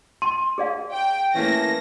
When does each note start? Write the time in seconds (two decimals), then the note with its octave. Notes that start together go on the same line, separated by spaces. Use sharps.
0.22 C6 D#7
0.58 G#4 D5 F5
0.93 G5
1.35 E3 A3 A#3 C#4 A#6